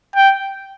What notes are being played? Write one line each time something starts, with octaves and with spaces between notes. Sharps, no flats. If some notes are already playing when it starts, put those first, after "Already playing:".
G5